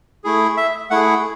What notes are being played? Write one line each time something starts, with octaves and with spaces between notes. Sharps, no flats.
A3 E4 G#4
E5
A3 E4 G#4 F#5